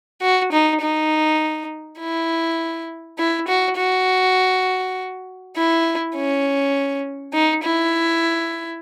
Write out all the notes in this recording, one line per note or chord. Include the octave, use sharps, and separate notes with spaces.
F#4
D#4
D#4
E4
E4
F#4
F#4
E4
C#4
D#4
E4